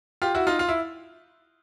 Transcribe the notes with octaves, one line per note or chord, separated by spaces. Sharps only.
F4 G4
E4 F#4
D#4 F4
F4
E4